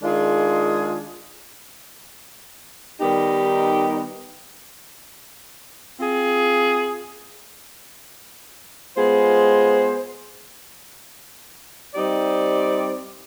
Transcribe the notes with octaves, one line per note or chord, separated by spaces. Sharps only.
D#3 G#3 D4 F4 G#4
D#3 G3 B3 D#4 G4
C4 F4 G#4
G#3 B3 F4 G#4 C5
G3 C4 D#4 G4 D5